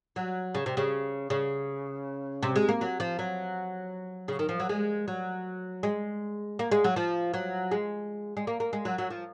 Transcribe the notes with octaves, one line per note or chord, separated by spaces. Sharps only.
F#3
C#3
C3
C#3
C#3
C3
G#3
A#3
F#3
F3
F#3
C#3
D#3
F3
F#3
G#3
F#3
G#3
A#3
G#3
F#3
F3
F#3
G#3
G#3
A#3
A#3
G#3
F#3
F#3
F3